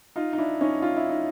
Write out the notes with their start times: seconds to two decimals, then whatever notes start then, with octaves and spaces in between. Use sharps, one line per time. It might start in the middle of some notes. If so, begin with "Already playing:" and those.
0.16 D#4 F4
0.33 D#4
0.38 D4 E4
0.61 C#4 D#4
0.82 F4
0.97 E4
1.09 D#4